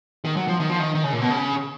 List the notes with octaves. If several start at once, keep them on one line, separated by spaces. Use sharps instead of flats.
D#3
F#3
F3
D#3
F3
D#3
D#3
C#3
A#2
B2
C#3